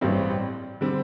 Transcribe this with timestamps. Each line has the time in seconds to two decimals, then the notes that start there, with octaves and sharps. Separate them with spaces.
0.01 A1 G2 G3 C4
0.81 D3 G3 C4